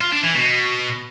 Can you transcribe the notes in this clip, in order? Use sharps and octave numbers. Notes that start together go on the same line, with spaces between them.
F4
D4
E3
B2